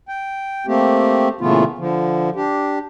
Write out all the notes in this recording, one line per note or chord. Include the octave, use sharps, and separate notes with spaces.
G5
A3 A#3 C4 G4
A#2 C#3 E3 A3 B3 F4
D3 F3
D4 G4